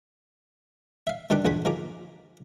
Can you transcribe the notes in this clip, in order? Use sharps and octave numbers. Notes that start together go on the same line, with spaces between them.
E5 F5
D#3 G3 D4 G4 B4 D6
A#1 E2 G#4 B4 F#5 B5
D#3 F3 G#4 A#5 D6